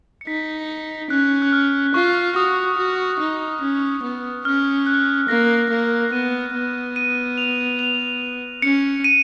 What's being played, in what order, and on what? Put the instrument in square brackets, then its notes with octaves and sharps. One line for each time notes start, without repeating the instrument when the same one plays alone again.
[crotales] C#7
[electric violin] D#4 [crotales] B6
[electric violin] C#4 [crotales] F#6
[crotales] F#6
F6
[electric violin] F4 [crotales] C#6
[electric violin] F#4 [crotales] D#6
[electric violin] F#4
D#4
C#4
B3
[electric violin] C#4 [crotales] F6
[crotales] F#6
[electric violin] A#3 [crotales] A#6
[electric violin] A#3
[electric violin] B3 [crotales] D#7
[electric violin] B3
[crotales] D#7
F7
F7
[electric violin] C#4 [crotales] C#7
[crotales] D#7